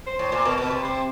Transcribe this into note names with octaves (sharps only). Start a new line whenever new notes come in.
C5
A2
A#2
B2 A#4
B2
B4
C3
C3 C5